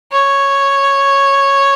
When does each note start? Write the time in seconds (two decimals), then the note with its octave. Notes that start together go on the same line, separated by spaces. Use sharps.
0.12 C#5